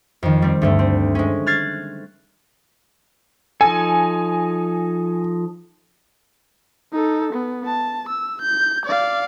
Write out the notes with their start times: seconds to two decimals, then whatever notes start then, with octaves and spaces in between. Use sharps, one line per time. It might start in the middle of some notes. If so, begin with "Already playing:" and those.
0.23 F2 D#3
0.42 G3 C4
0.62 D2 G2 A3
0.79 C4
1.15 G#3 C#4
1.46 F6 F#6 G#6 A6 C7
3.61 F3 D#4 A4 G#5
6.93 D#4 A4
7.33 B3
7.66 A5
8.09 E6
8.41 G6
8.86 D5 F5